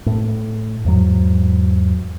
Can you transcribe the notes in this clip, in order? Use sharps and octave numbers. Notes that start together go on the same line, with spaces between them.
A2
E2 G#2 F#3